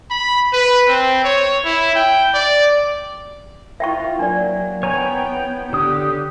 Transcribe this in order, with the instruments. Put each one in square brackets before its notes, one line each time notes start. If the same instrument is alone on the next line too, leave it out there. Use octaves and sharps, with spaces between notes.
[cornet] B5
B4
C4
C#5
E4
G5
D5
[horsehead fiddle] E4 F4 [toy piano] E5 G5 C#6
[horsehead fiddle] F#3 A#3 [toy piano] D4 D5
[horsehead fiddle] B3 G5 [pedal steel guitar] C#5 G#5 A#5
[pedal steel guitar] D3 D#6 [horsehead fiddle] G4